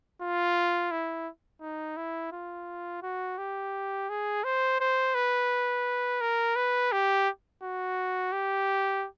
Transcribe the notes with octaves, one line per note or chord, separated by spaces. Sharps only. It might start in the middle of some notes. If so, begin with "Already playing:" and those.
F4
E4
D#4
E4
F4
F#4
G4
G#4
C5
C5
B4
A#4
B4
G4
F#4
G4